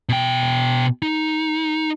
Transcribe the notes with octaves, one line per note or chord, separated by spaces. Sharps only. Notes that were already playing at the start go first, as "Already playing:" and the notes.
B2 G5
D#4